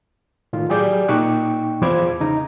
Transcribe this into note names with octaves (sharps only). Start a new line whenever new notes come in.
A2 D#3 F4
F#3 G4 G#4 D5 D6 G6
A#2 D#4 G5 C#6 D6 F#6
E2 F3 C5 B5 D6 G#6
C#3 D#4 A#5